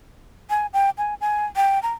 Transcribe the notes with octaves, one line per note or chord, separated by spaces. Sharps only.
G#5
G5
G#5
G#5
G5
A#5